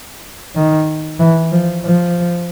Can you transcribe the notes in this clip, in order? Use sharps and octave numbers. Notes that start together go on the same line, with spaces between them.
D#3
E3
F3
F3